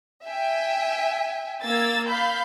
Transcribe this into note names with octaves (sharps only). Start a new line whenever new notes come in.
E5 G5 G#5
A#3 E6 G#6 A6
F5 B5 G6